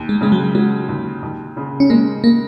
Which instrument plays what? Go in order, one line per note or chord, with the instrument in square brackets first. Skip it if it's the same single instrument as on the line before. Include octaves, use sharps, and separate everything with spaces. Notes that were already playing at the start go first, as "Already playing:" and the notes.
Already playing: [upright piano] D#2
[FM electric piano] G#3
[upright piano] C#3 [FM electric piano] G#3
[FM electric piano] F#3
[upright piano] F#3 [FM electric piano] G#3
[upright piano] D#2
D#2
C#3
[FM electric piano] C#4
[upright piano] G#3 [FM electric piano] A#3
[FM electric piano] A#3